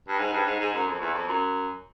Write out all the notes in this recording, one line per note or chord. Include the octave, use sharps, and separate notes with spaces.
G2
G#2
G2
G#2
G#2
F#2
F2
E2
F2
F#2